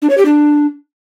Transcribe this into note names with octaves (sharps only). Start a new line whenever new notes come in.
D4
C#5
G4
D4